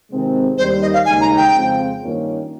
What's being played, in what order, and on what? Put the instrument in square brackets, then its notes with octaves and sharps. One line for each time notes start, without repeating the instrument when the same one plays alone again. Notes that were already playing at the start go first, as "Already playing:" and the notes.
[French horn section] C3 D#3 G#3 C4
[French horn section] D#2 D#3 G3 [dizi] C5
[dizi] D#5
F5
[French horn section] D#2 C#3 G#3 D#4 [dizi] G#5
[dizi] A#5
G5
[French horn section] F2 C#3 G#3 C4 F4
G2 D#3 A#3 C#4 F4